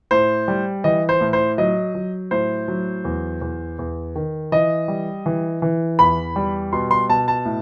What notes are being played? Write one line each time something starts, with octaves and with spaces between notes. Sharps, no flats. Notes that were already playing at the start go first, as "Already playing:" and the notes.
A2 C5
G3
E3 D#5
C5
A2
C5
F#3 D#5
F#3
A2 C5
F#3
E2
E2
E2
D#3
E3 D#5
G3
E3
E3
E2 B5
G3
B2 C6
C6
B2 A5
A5
A2